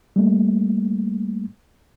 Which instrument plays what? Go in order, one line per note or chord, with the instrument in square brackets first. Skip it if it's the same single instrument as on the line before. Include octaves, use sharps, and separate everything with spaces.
[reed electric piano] G3 A3 A#3